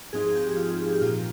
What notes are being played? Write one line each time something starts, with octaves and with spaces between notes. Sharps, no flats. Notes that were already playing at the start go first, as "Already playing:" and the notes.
G#2 F3 C4 D#4 G#4
G#4
G4
F4
G4
A#2 F3 A#3 F4